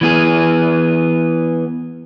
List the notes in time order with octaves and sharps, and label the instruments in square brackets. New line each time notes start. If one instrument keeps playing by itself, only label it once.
[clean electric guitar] E3 B3 G#4